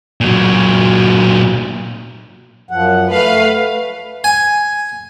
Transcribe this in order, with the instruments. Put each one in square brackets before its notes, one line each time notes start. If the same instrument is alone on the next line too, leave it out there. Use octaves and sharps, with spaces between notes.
[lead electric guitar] A#2 F#3
[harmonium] F#2 F3 F#5
[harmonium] A3 [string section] B4 F5
[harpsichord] G#5